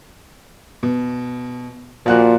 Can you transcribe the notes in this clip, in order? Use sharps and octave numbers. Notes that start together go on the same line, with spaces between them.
B2
A#2 F3 F#4 F#6